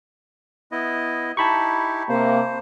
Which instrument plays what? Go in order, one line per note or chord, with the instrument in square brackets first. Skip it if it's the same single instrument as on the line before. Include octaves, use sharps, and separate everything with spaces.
[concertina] B3 E4 D#5
[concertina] D#4 E4 G4 [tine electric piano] A5 B5 C#6
[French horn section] C3 A#3 [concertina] C5